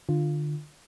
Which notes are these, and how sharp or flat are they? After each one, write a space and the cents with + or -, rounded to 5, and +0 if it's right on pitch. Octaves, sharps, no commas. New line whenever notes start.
D3 +25 F4 +0